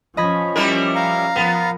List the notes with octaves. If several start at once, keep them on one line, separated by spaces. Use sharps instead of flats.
F3 C#4 D#5 B5 G#6
G3 E4 A#4
F5 A#5
F3 B3 A#4